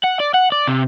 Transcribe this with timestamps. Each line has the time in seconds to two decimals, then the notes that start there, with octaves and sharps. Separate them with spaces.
0.04 F#5
0.20 D5
0.34 F#5
0.52 D5
0.68 C3